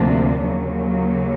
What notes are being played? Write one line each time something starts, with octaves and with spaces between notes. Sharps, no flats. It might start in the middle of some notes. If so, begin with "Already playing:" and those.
Already playing: D2 C3 F3 A#3 D4
D#2 C#3 F#3 A#3